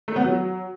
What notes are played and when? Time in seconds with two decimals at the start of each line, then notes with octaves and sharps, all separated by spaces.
0.08 A3
0.16 B3
0.24 F#3